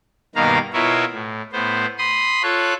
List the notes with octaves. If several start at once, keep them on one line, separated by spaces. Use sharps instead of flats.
G2 B2 D#3 A#3 F5 A#5
B2 E4 F4 A#4 C#5 E5
A2
A2 B3 C5
B5 C6 D#6
F4 A4 C#5 F#6